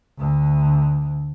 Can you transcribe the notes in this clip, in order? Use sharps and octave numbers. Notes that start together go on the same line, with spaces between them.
D2 D3